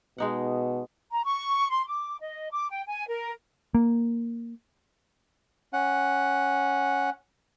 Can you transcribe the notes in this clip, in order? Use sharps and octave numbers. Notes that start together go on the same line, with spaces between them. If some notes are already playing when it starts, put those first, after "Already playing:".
B2 G#3 D#4 F#5
A#5
C#6
C6
D6
D#5
D6
G5
G#5
A#4
A#3
C#4 F#5